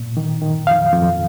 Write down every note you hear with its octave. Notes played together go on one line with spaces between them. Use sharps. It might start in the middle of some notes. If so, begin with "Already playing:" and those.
Already playing: A#2
D#3
D#3
F2 F5
F2